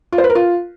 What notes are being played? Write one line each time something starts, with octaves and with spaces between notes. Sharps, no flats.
F4
C5
B4
A#4
F4